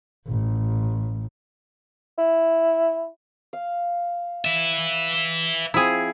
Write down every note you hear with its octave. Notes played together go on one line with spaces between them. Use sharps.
A1
E4
F5
B4 E5
F3 C4 E4 G#4